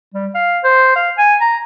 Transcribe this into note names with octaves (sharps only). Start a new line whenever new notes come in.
G3
F5
C5
F5
G#5
A#5